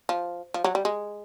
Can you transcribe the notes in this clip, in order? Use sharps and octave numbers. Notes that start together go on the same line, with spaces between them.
F3
F3
F#3
G3
G#3